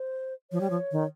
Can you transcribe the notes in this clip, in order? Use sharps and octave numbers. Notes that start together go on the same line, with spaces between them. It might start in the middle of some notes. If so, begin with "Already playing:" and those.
Already playing: C5
F3 C#5
G3
F3
D#3